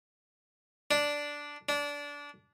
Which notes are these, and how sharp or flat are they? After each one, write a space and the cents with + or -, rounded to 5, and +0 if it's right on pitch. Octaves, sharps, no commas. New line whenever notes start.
D4 -5
D4 -20